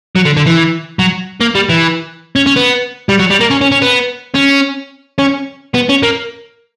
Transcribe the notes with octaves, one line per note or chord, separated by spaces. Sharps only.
F#3
D3
D3
E3
F#3
A#3
G3
E3
C#4
C#4
B3
G3
F#3
G3
A#3
C#4
C#4
C#4
B3
C#4
C#4
B3
C#4
A#3